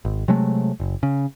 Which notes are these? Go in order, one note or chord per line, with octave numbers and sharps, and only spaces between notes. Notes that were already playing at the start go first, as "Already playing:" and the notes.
G#1
C3 F#3 G#3 A3
F#1
C#3